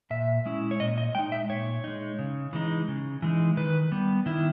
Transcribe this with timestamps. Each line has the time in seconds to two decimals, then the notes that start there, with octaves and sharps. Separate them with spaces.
0.10 A#2 E5
0.46 G#3 C#4 E4
0.71 C#5
0.80 A#2 D#5
0.98 D#5
1.15 G#3 D#4 G5
1.32 E5
1.50 A#2 C#5
1.84 G#3 D#4
2.19 C#3
2.53 E3 G#3 D#4
2.88 C#3
3.22 E3 G#3 D#4
3.57 D#3 B4
3.92 G3 B3
4.26 D#3 E4